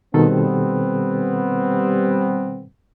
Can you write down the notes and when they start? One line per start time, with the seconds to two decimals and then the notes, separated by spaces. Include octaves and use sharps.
0.14 B2 D#3 G3 B3 C4 A4